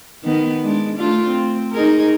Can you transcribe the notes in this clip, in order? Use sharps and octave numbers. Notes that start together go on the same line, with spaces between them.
D#3 B3
G#3 D4
A3 D4 F4
C4
D#4 G#4 A#4